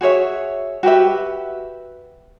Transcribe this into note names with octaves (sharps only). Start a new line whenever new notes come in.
F#4 G#4 C#5 E5
F#4 G4 B4 E5